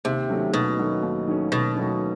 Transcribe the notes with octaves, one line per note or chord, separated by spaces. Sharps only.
D#2 C3
D#3 F#3 A3 C#4
D#2 B2
D#3 F#3 A3 C#4
D#2
D#3 F#3 A3 C#4
D#2 B2
D#3 F#3 A3 C#4